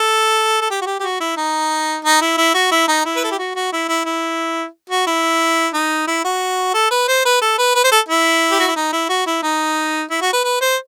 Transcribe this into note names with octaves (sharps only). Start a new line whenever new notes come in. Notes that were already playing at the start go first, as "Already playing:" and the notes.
Already playing: A4
A4
G4
F#4
G4
G4
F#4
E4
D#4
D#4
E4
E4
F#4
E4
D#4
E4
B4
A4
G4
F#4
F#4
E4
E4
E4
F#4
E4
D#4
E4
F#4
A4
B4
C5
B4
A4
B4
B4
C5
A4
E4
G4
F#4
E4
D#4
E4
F#4
E4
D#4
E4
F#4
B4
B4
C5